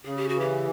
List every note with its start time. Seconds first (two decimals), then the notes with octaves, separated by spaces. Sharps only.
0.05 C#3 G#4
0.17 G4
0.29 F#4
0.36 E3 G4